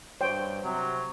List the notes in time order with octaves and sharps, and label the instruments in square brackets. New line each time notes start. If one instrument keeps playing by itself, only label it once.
[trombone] G2 [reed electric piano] C5 [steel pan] C#5 G5
[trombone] C3 [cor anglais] F#3